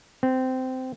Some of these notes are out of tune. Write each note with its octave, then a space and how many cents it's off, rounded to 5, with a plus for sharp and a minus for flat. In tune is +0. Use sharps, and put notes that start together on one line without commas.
C4 -15